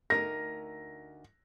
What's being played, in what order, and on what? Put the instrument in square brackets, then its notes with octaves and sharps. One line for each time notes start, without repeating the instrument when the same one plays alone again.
[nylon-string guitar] D2 D#4 A#4 [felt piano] A#6